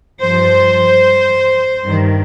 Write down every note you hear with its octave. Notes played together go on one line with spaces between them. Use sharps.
G2 F3 C5
G2 D#3